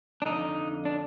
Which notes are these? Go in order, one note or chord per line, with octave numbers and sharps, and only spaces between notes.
D4
F2 D3 D#4
D4